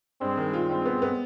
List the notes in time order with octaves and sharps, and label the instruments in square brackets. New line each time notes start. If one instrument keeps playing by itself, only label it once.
[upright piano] G2 [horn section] G#3 C4
[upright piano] D#3
F4
[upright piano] G2 [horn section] G#3 C4
[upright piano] B3
B3